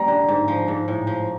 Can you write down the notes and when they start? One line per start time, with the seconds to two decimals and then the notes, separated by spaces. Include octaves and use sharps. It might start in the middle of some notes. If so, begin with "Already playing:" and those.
Already playing: G3 A#5
0.08 D3
0.28 G#2
0.48 F3
0.68 G#2
0.88 A2
1.07 F3